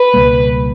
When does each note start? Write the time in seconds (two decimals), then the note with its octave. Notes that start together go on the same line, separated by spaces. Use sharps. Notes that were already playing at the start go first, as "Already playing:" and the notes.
Already playing: B4
0.14 C#2 B2 G3 A#3